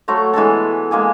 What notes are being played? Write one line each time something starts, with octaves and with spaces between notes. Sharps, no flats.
F#3 A3 A#5 C6
E3 G#3 B3 A4
G#3 A#3 G#4